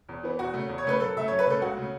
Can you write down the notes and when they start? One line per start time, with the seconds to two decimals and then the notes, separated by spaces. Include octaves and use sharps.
0.09 E2
0.23 E3 B3
0.39 E2 F#4
0.54 C#3 A3
0.69 E2
0.78 C#5
0.85 C#3 A3 B4
1.00 F#2 A4
1.16 C#3 A3 E5
1.28 F#2 C#5
1.39 B4
1.47 C#3 A3 A4
1.61 C#2 F#4
1.77 C#3 A3